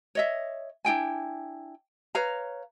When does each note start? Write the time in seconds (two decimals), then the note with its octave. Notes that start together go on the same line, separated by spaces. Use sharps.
0.15 C#5 D#5 E5
0.85 D4 E4 G5 G#5
2.15 B4 C#5 F5 A#5